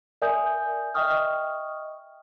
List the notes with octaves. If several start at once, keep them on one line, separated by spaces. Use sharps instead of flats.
A#4 D5 E5 G#5 D#6 G6
D#5 E5 G5 C#6 D#6 F6